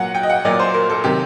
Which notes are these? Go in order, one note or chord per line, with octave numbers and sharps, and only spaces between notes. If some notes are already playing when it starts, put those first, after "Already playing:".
Already playing: A#2 F#3 F#5
G5
D#5
F#5
A#2 F#3 D5
C5
A#4
A4
C3 D#3 F#3 G4